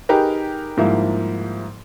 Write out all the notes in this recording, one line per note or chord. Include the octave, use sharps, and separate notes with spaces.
D#4 G4 G#4 A#4 B4
G#2 F3 G3 A#3 E4